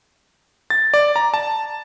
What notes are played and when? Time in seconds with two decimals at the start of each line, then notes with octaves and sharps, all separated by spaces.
0.70 A6
0.94 D5
1.16 A#5
1.34 A5